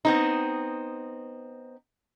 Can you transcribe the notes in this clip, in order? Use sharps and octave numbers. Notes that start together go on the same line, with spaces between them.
B3 C4 D#4